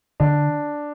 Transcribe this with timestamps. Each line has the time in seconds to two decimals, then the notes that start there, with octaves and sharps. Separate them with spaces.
0.20 D3 D4